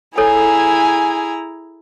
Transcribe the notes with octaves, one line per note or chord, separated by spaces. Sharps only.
E4 G#4 A4 C#5 G#5 A#5